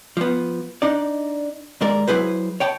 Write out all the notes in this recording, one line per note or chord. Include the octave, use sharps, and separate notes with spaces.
F3 B3
D4 D#4 D5
D#2 G#2 G#3 A#4 D5
F#3 E4 G#4 B4 C5
C#5 G5 A5